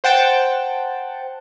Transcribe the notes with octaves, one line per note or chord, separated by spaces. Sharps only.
C5 F#5 G5 A5